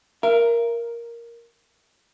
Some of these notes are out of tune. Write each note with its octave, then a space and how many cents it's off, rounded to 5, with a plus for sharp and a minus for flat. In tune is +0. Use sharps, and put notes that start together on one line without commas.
A#4 +5 E5 +45